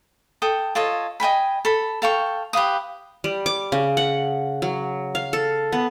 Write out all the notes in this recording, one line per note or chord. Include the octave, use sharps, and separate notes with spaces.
A4 G5 D#6
F4 A4 C#5 D#5
D#5 G5 G#5 B5
A4 B5
A4 F5 G5 C#6
G4 B4 F5 D#6
G3
D6
C#3
F#5
F#3
F5
A4
B3